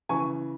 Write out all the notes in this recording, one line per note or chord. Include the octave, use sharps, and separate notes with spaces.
C#3 E3 G#5 C#6